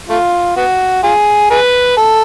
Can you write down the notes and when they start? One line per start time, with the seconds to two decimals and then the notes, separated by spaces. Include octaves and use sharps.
0.09 A3 F4
0.56 B3 F#4
1.03 F4 G#4
1.50 G#4 B4
1.97 A4